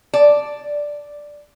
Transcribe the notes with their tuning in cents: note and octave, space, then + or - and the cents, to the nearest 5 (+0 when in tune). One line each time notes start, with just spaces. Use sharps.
D5 +0 A5 +0